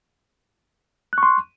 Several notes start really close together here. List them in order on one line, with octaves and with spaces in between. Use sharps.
F#6 C#6 C6